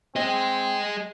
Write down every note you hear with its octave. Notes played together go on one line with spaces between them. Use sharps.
C4 G#4 D#5